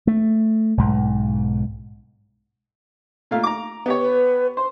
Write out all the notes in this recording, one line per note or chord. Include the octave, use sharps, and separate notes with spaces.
A3
B1 G#2
A#2 A3 F5
A#5 D6
B3 G4 C#5
B4
C5 C6